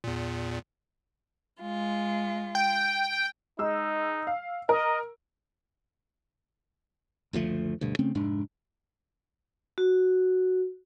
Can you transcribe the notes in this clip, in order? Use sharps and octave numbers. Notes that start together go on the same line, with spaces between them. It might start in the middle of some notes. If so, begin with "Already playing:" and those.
E2 A#2
G#3 F4
G5
G#3 D#4 E6
F5
A#4 D#5
F#1 D2 F3 A3
D2 G2 B2
C#3 A3 C4 C#4
F1 G#2 G#3 D4
F#4